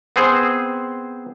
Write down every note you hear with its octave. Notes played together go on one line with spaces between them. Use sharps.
B3 C4 G#4 C5